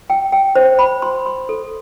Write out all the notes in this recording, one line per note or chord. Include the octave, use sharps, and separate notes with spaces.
G5
G5
C5
B5
C6
C6
A4